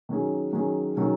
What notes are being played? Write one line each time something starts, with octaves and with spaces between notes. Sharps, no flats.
D#3 F#3 C#4 G#4
D#3 F#3 C#4 G#4
D#3 F#3 C#4 G#4